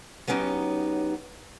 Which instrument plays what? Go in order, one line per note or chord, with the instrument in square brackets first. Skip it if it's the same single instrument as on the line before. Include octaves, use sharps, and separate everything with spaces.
[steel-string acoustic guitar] F#3 B3 C#4 D#4 G4